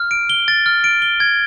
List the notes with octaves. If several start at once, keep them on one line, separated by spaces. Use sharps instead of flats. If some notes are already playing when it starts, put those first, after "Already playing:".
Already playing: F6
D7
G7
A6
F6
D7
G7
G#6